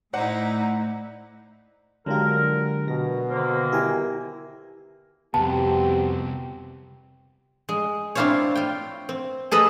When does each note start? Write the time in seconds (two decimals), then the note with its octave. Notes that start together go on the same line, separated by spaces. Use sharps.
0.13 A2 D#4 E4 C5 D5 F#5
2.06 D3 F#3 G#3 D4 F4 G4 A#4
2.88 B2 A#6
3.31 D3 D#3 A#3 C5
3.72 E4 G4 A#4 G#5
5.34 C2 F2 B3 C4 F#4 G4 A5
7.69 G#3
8.15 C4 D4 E4 F4 C5 C#5
8.55 F4 C#5 G5
9.09 C4
9.52 G#4 A4 B4 D#5